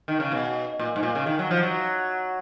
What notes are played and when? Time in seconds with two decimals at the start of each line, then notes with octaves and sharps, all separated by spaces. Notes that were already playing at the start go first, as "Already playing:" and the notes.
0.08 D#3
0.20 C#3
0.32 B2
0.79 A#2
0.96 G#2
1.03 A#2
1.15 C#3
1.26 D#3
1.39 F#3
1.51 F3
1.63 F#3